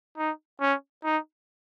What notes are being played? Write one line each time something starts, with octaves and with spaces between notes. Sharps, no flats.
D#4
C#4
D#4